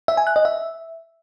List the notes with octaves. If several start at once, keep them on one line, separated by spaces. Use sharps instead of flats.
E5
G#5
F#6
D#5
E5